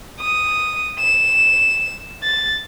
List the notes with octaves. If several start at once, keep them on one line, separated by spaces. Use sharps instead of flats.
D#6
E7
A6